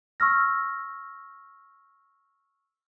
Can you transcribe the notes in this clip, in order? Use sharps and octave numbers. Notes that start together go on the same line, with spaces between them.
C#6 E6 F6 A#6